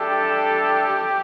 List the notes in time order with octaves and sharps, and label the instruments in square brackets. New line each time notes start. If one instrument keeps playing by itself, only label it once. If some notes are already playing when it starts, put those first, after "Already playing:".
Already playing: [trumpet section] G3 D4 A4 E5 G5 [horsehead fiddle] G4